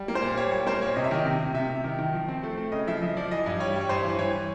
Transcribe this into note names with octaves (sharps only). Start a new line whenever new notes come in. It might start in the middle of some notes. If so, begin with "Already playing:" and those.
Already playing: G3
A#3
C5
A#2
G3 C#5
G3 C#5
A#3 C5
A#2 C#5
C3 D#5
E5
D#3 D#5
C3
C3
C3 E5
C3
D#3
D#3
F3
C4
A3
A3
C#3 D#5
F3 E5
F3 D#5
F3 D5
E3 D#5
G2
G3 C#5
G3
C#5
G2 C5
E3
E3 C#5